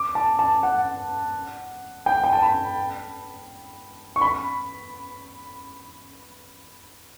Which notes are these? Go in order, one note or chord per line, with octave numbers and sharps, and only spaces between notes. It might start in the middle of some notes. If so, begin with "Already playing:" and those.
Already playing: D6
A5
A5
F#5
G5
G5
A5
B5
C#6
B5